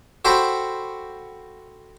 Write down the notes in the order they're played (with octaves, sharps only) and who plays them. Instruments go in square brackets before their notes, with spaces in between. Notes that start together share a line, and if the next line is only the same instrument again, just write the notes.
[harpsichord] F#4 A4 C5 G5 B5 C6